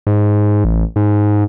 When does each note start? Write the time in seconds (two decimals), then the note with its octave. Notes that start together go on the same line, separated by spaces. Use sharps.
0.07 G#2
0.64 A1
0.96 G#2